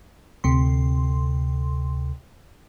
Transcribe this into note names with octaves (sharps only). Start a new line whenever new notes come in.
D2 C3 C6